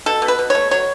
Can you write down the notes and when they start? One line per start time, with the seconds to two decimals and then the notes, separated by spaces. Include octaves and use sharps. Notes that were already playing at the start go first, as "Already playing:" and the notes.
0.06 B2 A4
0.22 B2
0.28 B4
0.39 B2
0.50 A3 C#5
0.71 F#3 C#5